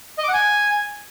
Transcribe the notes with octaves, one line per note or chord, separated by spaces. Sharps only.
D#5
D6
F#5
G#5